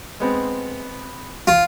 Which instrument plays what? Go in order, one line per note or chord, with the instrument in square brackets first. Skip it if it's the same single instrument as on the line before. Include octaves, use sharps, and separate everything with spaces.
[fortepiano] G#3 B3 C4
[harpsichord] F4